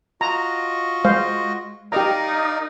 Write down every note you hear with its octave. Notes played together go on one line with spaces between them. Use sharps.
F4 F#4 D#5 A#5
G#3 C5 F5
D#4 G4 A#4 D5 D#5 F5 A#5